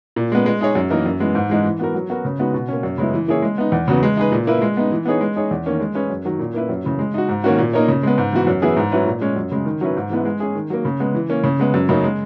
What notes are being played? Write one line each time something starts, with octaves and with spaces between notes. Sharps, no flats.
A#2
G#3 B3
G#3
D#4 G#4 C#5
F#2
E3 A#3 D#4 A#4
F#2
E3 G#3 B3
G#2
E3 G#3 D#4
E3
B3 F#4 A#4
F#3
B3 F#4 A#4
C#3
G#3 B3 D#4 F#4
B2
A#3 C#4
F#2
C#3 G#3 B3 E4
E3
A#3 E4 G#4 C#5
G#3
B3 D#4
E2
C#3 F#3 B3
G#3
D#4 G#4 B4
A#2
A#3 E4 B4
G#3
B3 D#4
E3
B3 D#4 G#4 C#5
G#3
D#4 G#4 C#5
E2
D#3 A#3 C#4
G#3
C#4 G#4 B4
F#2
D#3 F#3
A#2
A#3 E4 B4
F#2
C#3 E3
G#3
D#4 F#4
G#2
D#3 A#3 C#4 F#4
A#2
A#3 D#4 A#4 C#5
C#3
G#3 B3
G#2
E3 B3 F#4
F#2
E3 B3 E4 G#4
G#2
F#3 C#4 E4 B4
A#2
G#3 C#4
F#2
C#3 G#3
D#3
F#3 C#4 E4 B4
G#2
E3 G#3 B3 E4
G#3
C#4 G#4
D#3
F#3 A#3
C#3
G#3 B3
E3
A#3 C#4
C#3
G#3 B3
F#2
C#3 F#3 A#3 D#4
G#3